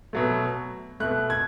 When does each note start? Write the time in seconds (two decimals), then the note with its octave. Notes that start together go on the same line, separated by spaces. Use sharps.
0.13 B2 F#3 A3
1.00 B2 A3 F#6
1.30 G#6